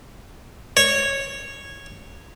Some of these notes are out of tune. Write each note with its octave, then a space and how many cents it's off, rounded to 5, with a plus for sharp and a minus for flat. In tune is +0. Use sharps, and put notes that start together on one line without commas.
C#5 -10